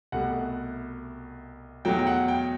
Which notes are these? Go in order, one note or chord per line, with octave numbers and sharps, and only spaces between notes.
C2 B2 A3 F#5
E2 B2 F#3 A3 G5
G5
F#5
G5